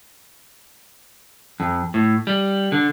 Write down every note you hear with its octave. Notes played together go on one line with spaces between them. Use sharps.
F2
A2
G3
D3